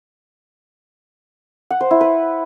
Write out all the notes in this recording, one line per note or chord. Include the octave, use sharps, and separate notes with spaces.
F#5
C5
E4
B4